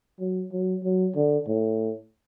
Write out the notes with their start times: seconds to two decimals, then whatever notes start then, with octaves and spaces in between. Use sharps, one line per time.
0.20 F#3
0.52 F#3
0.84 F#3
1.16 D3
1.47 A2